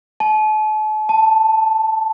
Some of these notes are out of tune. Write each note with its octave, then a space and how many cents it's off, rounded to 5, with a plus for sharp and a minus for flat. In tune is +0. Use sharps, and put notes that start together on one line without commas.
A5 -40
A5 +5